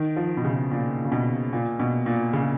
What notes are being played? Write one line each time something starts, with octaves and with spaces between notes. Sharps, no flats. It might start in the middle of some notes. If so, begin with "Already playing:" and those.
Already playing: D#3
F3
B2
C#3
A#2
C#3
B2
A#2
B2
A#2
C#3